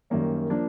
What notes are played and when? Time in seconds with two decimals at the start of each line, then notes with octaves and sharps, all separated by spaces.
0.10 F#2 D#3 G3 A#3 C#4
0.50 F3 A#3 D4